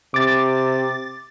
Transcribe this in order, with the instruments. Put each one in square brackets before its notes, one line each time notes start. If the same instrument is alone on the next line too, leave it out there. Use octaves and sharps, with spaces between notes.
[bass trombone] C3 [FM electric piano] D6 A6